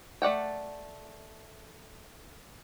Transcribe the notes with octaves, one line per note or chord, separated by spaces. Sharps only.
A3 D5 F#5 G5